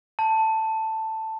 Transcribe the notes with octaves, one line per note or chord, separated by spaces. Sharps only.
A5